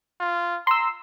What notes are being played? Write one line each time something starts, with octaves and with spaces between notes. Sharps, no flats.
F4
A#5 C6 E6